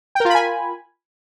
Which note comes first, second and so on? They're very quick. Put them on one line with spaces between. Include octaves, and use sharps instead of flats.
G5 A#4 F4 B5 G#5